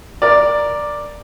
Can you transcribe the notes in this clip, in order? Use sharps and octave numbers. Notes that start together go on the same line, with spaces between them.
A#4 D5